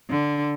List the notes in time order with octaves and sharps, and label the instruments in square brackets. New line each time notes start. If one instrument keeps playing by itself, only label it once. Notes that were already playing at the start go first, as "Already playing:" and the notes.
[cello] D3